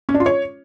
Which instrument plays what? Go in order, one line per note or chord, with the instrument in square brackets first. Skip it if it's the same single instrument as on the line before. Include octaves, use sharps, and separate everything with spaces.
[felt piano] C#4
D4
F4
C#5